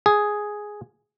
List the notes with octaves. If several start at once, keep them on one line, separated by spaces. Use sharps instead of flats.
G#4